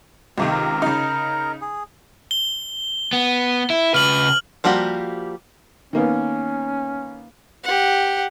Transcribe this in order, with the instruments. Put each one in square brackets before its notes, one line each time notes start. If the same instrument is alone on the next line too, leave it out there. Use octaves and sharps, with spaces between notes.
[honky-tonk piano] C#2 C3 D#3 [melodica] A3
[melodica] A#4
[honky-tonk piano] C#3 D#4
[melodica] G#4
[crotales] G7
[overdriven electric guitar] B3
E4
[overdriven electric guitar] C#3 B4 [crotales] F6 F#7
[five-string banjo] F3 G3 A#3 F#4 G4
[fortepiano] D#3 A#3 B3 [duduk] C#4
[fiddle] G4 F#5